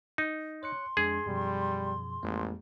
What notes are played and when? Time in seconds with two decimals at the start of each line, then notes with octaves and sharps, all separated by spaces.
0.18 D#4
0.63 C#5 C6 F#6 C#7
0.97 F2 G#3 D4 G#4
1.26 F#2 B2 F3 G3
2.23 A1 F2 G#3 A#3